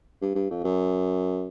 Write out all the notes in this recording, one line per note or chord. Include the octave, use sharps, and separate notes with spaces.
G2
G2
F2
F#2